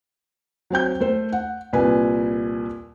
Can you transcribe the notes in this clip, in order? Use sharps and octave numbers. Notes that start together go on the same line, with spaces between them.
F#3 C4 G5 G6
A3 C5
F#5
C2 A#2 B4 G#5